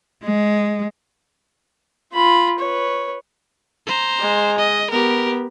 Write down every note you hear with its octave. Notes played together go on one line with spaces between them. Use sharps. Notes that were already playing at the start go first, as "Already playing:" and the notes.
G#3
F4 B5
B4 C#5
C5 A#5
G#3
D#5
B3 G4 A#4